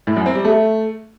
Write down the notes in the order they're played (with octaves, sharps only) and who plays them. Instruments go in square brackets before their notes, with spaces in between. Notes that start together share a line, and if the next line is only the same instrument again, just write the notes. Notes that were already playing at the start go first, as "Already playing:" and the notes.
[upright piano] A2
F#2
C4
G3
A3